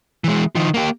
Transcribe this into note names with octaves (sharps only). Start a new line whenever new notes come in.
E3 G#3
D#3 F3
A#3 G4